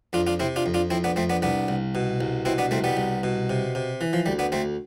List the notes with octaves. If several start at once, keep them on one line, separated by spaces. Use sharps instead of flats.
F2 D4 F4
D4 F4
C3 C4 E4
D4 F4
F2
D4 F4
F2 C4 E4
B3 D4
F2 A3 C4
B3 D4
C2 B3 D4
C2
B2
C2
B2 C4 E4
B3 D4
C2 A3 C4
G3 B3
C2
B2
C3
C3
E3
F3
D2 G3
B3 D4
D2 A3 C4